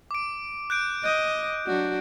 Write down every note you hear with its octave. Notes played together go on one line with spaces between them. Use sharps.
D6 D7
F#6 G6 D7
D#5 F#6 G6
F#3 D4 F#4